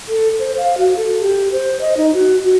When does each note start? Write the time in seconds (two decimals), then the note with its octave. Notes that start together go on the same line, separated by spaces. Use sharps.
0.08 A4
0.39 C5
0.58 F5
0.78 F#4
0.97 A4
1.20 G4
1.52 C5
1.81 D#5
1.97 D#4
2.14 F#4
2.42 F#4